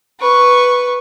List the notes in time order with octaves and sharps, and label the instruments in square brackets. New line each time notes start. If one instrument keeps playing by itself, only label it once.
[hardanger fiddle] B4 C#6